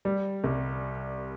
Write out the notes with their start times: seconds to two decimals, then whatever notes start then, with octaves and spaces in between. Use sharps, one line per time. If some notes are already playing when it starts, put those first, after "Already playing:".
0.05 G3
0.44 C2